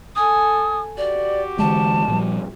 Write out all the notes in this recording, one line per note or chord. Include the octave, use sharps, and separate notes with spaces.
A4 G#5 D#6
F#4 G4 D5
D3 E3 G#3 A5
A#2 F3 G3